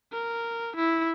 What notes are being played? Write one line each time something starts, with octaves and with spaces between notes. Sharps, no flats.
A#4
E4